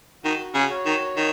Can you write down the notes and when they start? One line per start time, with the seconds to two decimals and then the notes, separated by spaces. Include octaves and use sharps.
0.23 D#3 F#4
0.54 C#3
0.70 C#5
0.85 D#3
1.16 D#3 D#4